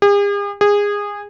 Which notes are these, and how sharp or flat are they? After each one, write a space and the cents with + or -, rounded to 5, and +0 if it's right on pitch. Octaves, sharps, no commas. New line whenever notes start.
G#4 -45
G#4 -20